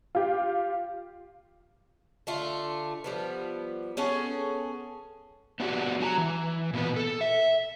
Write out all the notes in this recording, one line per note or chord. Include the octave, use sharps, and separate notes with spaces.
F4 G4
D3 A3 F4
F3 G3 B3
B3 C#4 G#4 A4
B3 D4 F#4 G4
F#3 G#5 A#5
E3
A#2 B3 B4
A4
E5